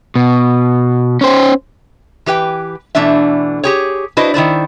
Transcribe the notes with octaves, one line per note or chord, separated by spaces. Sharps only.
B2
C#4 C5
E3 G4 B4 G5
B2 E3 A3 D4 E5
G4 G#4 C#5
D4 E4 F#4 B4 C5 D#5
D#3 E4 C5 D5